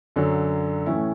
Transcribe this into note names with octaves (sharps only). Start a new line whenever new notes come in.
F#2 D3 F#3
A2 E3 A3 C#4 E4